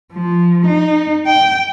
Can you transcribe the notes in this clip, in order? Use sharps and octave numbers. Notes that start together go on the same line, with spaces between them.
F3
D#4
G5